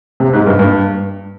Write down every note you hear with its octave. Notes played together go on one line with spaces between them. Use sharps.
C3
G#2
G2
G2